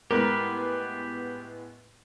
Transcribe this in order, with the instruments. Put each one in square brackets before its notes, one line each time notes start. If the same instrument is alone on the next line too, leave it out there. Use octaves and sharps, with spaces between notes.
[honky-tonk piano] A2 G#3 B3 [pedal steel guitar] G4 B4 [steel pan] A#4